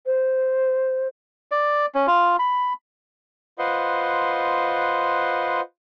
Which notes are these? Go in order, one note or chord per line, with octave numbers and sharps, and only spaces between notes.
C5
D5
C#4
F4
B5
F4 B4 C5 D#5 F#5 C6